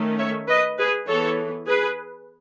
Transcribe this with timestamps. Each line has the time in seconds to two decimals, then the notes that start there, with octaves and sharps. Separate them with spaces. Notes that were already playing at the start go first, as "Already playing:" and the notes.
Already playing: D#3 A3 C#4
0.19 C#5 E5
0.48 B4 D#5
0.78 G#4 B4
1.08 E3 B3 A4 C#5
1.67 G#4 B4